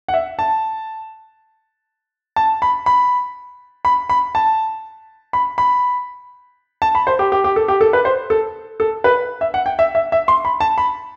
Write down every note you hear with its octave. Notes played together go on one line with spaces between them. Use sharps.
F#5
E5
A5
A5
B5
B5
B5
B5
A5
B5
B5
A5
B5
C5
G4
G4
G4
A4
G4
A4
B4
C5
A4
A4
B4
E5
F#5
G5
E5
E5
E5
C6
B5
A5
B5